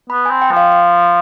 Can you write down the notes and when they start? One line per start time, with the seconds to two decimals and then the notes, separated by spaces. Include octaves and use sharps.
0.10 B3 B5
0.26 G#5
0.31 C4
0.42 G5
0.51 F3
0.57 F5
0.72 F5